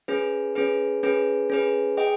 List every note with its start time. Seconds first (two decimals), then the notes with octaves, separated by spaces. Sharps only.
0.08 C#4 G#4 B4
0.55 C#4 G#4 B4
1.03 C#4 G#4 B4
1.50 C#4 G#4 B4
1.97 G#4 D#5 G5